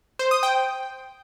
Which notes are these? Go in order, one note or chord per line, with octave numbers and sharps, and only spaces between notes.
C5
D#6
G5